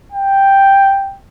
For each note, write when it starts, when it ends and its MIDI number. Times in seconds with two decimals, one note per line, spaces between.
0.12 1.17 79